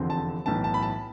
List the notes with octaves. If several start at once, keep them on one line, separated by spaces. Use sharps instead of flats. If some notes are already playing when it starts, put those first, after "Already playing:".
Already playing: F1 E2 D3 F3 C4
A5
B1 A2 E3 B3 A5
A5
B5
A5